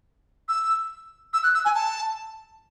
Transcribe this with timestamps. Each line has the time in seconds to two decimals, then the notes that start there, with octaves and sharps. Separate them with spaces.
0.49 E6
1.33 E6
1.44 F#6
1.54 E6
1.65 G#5
1.75 A5